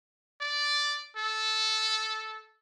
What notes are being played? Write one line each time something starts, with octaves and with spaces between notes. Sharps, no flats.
D5
A4